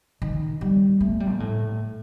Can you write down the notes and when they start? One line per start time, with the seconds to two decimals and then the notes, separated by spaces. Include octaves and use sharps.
0.22 D#3
0.61 G3
1.01 A3
1.20 G3
1.32 A#2
1.40 A2